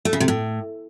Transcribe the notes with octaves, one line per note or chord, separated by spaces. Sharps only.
A3
C#3
C3
A2